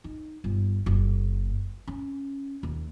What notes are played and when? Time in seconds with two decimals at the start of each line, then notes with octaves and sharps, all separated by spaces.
0.04 D#4
0.44 G1
0.86 F#1
1.87 C#4
2.63 D#2